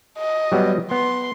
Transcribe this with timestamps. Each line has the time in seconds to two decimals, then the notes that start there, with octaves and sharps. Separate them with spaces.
0.19 D#5
0.52 F#3 G3 B3
0.91 B3 C6